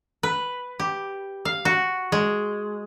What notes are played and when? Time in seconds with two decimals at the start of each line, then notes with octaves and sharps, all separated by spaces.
0.23 B4
0.80 G4
1.45 F5
1.65 F#4
2.12 G#3